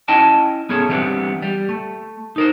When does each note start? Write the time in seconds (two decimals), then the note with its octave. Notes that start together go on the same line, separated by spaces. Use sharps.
0.08 C#4 E4 D#5 G5 A5
0.69 B3 C#4 G#4 A4
0.89 E3 G3 G#3 B3 C4 D4
1.42 G3
1.69 A3
2.36 D#4 A#4 C5